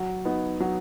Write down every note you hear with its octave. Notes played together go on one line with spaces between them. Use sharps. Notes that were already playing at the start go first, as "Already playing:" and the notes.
Already playing: F#3
B3 D#4
F#3